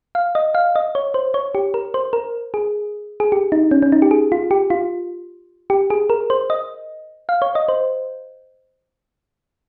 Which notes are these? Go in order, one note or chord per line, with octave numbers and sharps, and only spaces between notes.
F5
D#5
F5
D#5
C#5
C5
C#5
G4
A#4
C5
A#4
G#4
G#4
G4
D#4
C#4
C#4
D#4
G4
G#4
F4
G4
F4
G4
G#4
A#4
C5
D#5
F5
C#5
D#5
C5